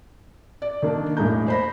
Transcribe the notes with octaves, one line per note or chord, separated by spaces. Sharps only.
D5
D#3 A#3 D4
E1 A2 G#3 A#3 A#5 G6
C5 B5 A#6